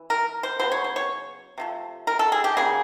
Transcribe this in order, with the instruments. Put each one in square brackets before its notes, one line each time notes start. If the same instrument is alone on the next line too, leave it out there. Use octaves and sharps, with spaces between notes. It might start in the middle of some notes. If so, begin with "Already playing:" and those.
Already playing: [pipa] E3
A#4
C5
C#3 F#3 B3 C5
C#5
C5
C#5
C3 F3 A3
A#4
A4
G#4
G4
C#3 F#3 A#3 G#4